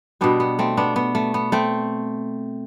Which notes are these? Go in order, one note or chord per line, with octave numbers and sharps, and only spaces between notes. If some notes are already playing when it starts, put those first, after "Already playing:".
B2 G3 B3 D4
B3
A3 C4
B3 D4
B3
A3
B3
A3 C4